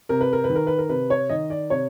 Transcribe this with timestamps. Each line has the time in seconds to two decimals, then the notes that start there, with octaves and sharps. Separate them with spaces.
0.09 C3 A#4
0.21 B4
0.33 A#4
0.44 B4
0.50 D#3
0.56 A#4
0.67 B4
0.78 A#4
0.89 C3 B4
1.10 C#5
1.29 D#3 D#5
1.50 D5
1.70 C3 C#5